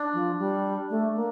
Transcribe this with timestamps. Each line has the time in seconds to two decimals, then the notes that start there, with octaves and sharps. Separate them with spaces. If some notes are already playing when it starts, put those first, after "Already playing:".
Already playing: D4
0.13 F3
0.38 G3
0.90 A3
1.15 A#3